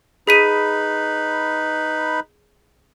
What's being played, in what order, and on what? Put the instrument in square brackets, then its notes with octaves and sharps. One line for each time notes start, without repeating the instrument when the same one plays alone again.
[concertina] D#4 B4 B5 [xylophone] G#4 B6 D#7